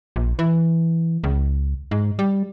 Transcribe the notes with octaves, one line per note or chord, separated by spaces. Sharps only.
A#1
E3
C#2
G#2
G3